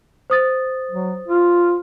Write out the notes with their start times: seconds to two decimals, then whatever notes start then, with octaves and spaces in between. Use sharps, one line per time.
0.30 C5 D#6 A6
0.91 F#3
1.28 F4